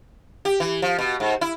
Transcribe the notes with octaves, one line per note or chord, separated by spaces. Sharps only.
G4
E3
F3
B2
G#2
E4